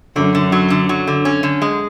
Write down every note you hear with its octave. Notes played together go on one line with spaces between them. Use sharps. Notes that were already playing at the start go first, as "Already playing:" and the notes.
F#2 D3
D3
F#3
D3
F#3
D3
C#4
D3
G#3